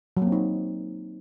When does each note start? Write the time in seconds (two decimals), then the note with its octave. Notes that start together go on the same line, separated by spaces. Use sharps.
0.17 F#3
0.22 A#3
0.27 C4
0.32 D#4